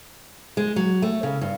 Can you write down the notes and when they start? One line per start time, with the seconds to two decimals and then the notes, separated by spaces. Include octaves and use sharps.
0.57 G#3
0.76 F#3
1.02 A3
1.23 C#3
1.41 G2